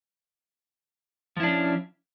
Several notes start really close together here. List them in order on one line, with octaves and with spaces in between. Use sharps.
F3 E4 D4 C#4